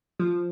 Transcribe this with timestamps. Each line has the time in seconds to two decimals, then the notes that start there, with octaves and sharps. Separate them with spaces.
0.19 F3